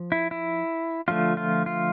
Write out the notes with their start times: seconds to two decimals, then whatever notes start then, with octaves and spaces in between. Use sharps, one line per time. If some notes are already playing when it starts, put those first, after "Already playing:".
Already playing: F3
0.12 E4
0.31 E4
1.08 D3 F3 A3 F4
1.37 F4
1.66 F4